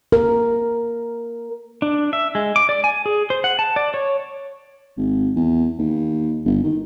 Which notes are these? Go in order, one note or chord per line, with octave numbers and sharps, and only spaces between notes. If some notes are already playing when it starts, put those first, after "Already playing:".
A#4
D4
E5
G#3
D6
D5
G#5
G#4
C5
F#5
A5
D5
C#5
G#1
E2
D#2
G1
D#3